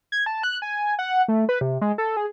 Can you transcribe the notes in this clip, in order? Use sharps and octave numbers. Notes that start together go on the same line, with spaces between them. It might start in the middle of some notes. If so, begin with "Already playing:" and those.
G#6
A5
F#6
G#5
F#5
A3
B4
C3
G#3
A4
G#4